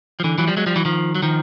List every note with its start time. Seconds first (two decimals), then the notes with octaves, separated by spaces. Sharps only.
0.20 F3
0.24 D3 E3
0.38 E3 F#3
0.47 F3 G3
0.57 F#3 G#3
0.66 F3 G3
0.76 E3 F#3
0.85 D#3 F3
1.15 F#3
1.23 D#3 F3